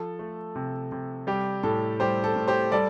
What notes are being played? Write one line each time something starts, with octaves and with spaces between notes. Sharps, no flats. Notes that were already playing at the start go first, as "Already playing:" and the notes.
Already playing: F3 A4
A3
C3
C3
G3 G4
A2 A4
G3 G4 C5
A4
A2
G4 C5
G3 A4 D5